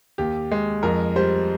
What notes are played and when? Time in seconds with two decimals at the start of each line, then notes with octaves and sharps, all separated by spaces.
0.18 D#2 G4
0.52 G#3
0.83 F2 A#4
1.16 G3 C5